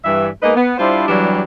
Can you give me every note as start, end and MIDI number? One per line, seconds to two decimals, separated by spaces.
0.05 0.28 43
0.05 0.28 52
0.05 0.28 76
0.43 0.54 56
0.43 0.54 58
0.43 0.54 59
0.43 0.54 63
0.43 0.54 71
0.43 0.54 75
0.56 0.74 59
0.78 1.07 55
0.78 1.07 62
0.78 1.07 64
0.78 1.07 65
0.78 1.07 72
1.08 1.41 52
1.08 1.41 54
1.08 1.41 55
1.08 1.41 62
1.08 1.41 67